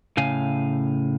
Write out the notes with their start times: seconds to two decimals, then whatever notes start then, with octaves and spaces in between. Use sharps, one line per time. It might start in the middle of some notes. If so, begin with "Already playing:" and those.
0.17 A2 C#3 F5 G#5